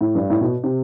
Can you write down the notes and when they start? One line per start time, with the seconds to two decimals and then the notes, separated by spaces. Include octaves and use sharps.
0.01 A2
0.15 G2
0.30 A2
0.41 B2
0.64 C3